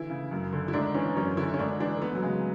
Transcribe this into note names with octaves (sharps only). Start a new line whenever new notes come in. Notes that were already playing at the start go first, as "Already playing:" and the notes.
Already playing: D3 E3 E4
C#3
F#2
D3
E4
G#2 D4
E3 C#4
F#2 C#4
D3 E4
C#4
G#2 D4
E3 D4
A3
E3 B3
F#3
C#3 G#3